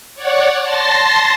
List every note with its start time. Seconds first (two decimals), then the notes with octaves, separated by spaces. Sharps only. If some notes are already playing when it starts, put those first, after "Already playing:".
0.15 C#5 D5 F#5
0.62 A5 C6 A6 A#6 C7